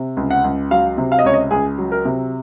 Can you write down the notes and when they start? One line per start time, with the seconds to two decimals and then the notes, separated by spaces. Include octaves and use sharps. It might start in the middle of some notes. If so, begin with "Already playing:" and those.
Already playing: C3
0.17 C#2
0.31 F#5
0.44 C#2
0.71 F#3 F5
0.98 C3
1.12 F5
1.19 D#5
1.25 C#2 C#5
1.34 D#5
1.51 C#2 G#4
1.78 F#3
1.92 A#4
2.05 C3